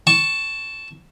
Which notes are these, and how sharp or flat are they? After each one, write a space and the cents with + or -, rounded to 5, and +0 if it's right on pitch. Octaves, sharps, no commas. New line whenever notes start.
A5 +0 C#6 +0